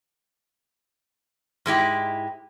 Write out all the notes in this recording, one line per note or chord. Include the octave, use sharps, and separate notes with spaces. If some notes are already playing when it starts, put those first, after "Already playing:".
G#2 G#3 E4 G4